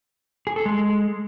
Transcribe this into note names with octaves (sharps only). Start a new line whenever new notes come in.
G#4
A4
G#3